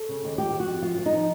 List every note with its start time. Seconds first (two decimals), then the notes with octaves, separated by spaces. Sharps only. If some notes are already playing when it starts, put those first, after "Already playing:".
Already playing: A4
0.09 C#3
0.24 D#2
0.38 F3 G4
0.53 F3
0.60 F#4
0.67 F2
0.82 F3 F4
0.98 F3
1.06 D#4
1.12 F3